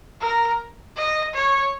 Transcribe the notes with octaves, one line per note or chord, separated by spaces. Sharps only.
A#4
D#5
C#5